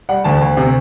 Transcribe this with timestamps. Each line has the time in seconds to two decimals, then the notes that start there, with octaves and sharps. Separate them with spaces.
0.09 G3 F#5
0.24 D2 A5
0.41 D2
0.57 C3